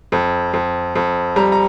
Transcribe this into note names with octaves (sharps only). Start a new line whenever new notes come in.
F2
F2
F2
G3 A#5
A#5